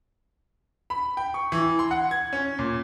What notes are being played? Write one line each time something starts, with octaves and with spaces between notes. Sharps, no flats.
B5
G5
C#6
E3
C6
F#5
G#6
C#4
A#2